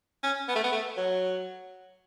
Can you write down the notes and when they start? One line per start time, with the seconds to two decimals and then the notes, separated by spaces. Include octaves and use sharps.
0.23 C#4
0.48 B3
0.55 A3
0.64 B3
0.72 A3
0.97 F#3